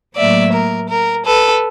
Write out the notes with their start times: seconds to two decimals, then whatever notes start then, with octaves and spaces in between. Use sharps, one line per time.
0.17 A2 F#3 A#3 D5 E5
0.53 A#4
0.90 A#4
1.26 A4 B4